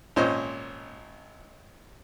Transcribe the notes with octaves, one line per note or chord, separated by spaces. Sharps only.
G#1 A#2 C#4 C5 D#5